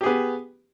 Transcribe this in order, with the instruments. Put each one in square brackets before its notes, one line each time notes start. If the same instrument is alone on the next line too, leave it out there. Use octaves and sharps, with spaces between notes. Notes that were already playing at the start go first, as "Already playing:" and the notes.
[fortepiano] G4
G#4
B3